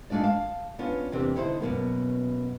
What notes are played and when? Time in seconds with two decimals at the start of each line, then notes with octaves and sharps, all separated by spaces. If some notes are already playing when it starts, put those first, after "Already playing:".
0.10 G#3 A3 D4 F4 D5
0.24 F5 A5
0.79 B3 C#4 D4 F4
1.12 E2 C3 A#3 C4 D4
1.35 D3 D#4 E4 A#4 C5
1.60 F#2 B2 A#3 B3